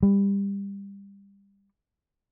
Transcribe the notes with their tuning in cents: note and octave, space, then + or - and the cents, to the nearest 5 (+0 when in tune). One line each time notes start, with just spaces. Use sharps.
G3 +25